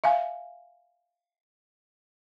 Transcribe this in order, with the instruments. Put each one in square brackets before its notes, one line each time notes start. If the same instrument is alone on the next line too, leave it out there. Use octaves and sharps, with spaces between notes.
[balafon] E5 F5 G#5